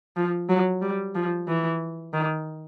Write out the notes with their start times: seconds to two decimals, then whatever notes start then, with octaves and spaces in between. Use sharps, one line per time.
0.17 F3
0.49 F#3
0.82 G3
1.15 F3
1.48 E3
2.13 D#3